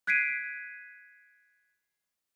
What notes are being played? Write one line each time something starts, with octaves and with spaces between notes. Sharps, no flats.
F#6 G#6 B6 C7 D7 D#7